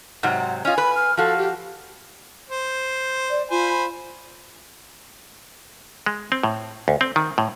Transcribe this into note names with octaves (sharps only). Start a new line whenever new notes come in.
G#2 C3 F#3 F#5
C#4 F4 D#5 G#5
B4 B5
F6
F3 F#4 A4 F5
G4
C5
D5
F4 C5 G#5 B5
G#3
C4
A2
D2
C4
D#3
A2